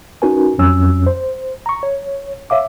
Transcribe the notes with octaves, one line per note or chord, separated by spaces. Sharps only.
C#4 D#4 F#4 A#4 B4 G#5
F2 F#3 C#4 E6
C5
A#5 C#6
C#5
C#5 E5 F5 D6